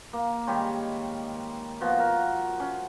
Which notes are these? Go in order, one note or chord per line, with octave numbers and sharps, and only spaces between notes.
A#3
D#3 G3 G#3 C#5
B2 F3 F#4
A#4
C#4